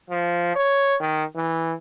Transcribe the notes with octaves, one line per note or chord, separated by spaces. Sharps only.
F3
C#5
D#3
E3